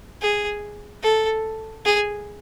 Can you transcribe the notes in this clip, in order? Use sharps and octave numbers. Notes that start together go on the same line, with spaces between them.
G#4
A4
G#4